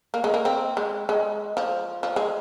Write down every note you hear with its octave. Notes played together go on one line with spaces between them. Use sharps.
A#3
G#3
A#3
C4
G#3
G#3
F3
F3
G#3